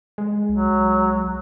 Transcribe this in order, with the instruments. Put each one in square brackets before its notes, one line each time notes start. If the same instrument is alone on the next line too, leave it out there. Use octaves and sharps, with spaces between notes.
[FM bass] G#3
[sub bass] C2 [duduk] F#3